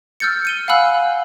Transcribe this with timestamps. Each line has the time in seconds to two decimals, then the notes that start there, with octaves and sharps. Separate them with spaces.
0.20 E6 F6 G6 A6 C#7
0.45 C#7 D#7 G7
0.68 F5 F#5 G#5 B5 E6 F#6